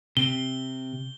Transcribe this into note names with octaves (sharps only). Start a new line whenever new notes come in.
C3 G7